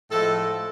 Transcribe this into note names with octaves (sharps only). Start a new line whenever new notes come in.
A2 F3 G#3 A4